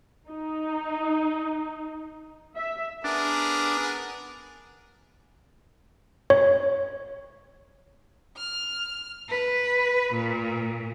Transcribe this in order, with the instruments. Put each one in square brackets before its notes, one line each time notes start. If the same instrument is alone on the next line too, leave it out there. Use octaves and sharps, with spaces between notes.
[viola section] D#4
E5
[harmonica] B3 G#4 A#4 [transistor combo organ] D4
[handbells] C#5
[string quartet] F6
B4
A#2